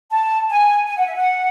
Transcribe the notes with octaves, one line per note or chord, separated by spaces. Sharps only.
A5
G#5
G#5
F#5
E5
F#5